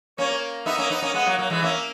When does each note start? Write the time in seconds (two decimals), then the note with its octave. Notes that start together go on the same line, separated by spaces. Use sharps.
0.18 A#3 C#4 C#5
0.66 B3 D#4 E5
0.78 A#3 C#4
0.90 B3 D#4
1.02 A#3 C#4
1.14 G#3 B3 F#5
1.26 F#3 A#3
1.38 F#3 A#3
1.50 E3 G#3
1.62 A#3 C#4 E5